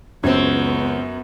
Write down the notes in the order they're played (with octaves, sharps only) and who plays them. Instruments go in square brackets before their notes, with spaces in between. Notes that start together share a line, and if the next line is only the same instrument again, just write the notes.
[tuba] C#2 [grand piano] F#2 [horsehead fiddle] B3 [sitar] C4 C#5